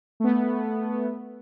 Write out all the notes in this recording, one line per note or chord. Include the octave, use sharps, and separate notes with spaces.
A3 B3